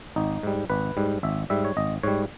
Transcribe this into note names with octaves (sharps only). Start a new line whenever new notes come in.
G#1 D#4
G#2 G3
G#1 B4
G#2 G3
G#1 E5
G#2 G3 E5
C#5
G#1 D#5
G#2 G3 C#5